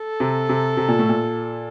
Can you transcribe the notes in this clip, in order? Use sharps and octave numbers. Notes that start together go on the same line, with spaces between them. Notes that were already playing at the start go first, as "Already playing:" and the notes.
Already playing: A4
C3
C3
C3
A#2
A2
A#2